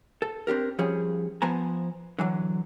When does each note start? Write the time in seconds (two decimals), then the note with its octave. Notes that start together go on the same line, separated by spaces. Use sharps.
0.22 A4
0.47 C4 D4 G4 A#4
0.79 F3 G3 C#4 G#4
1.42 F3 B3 C5 G#5 A#5
2.19 D3 E3 F#3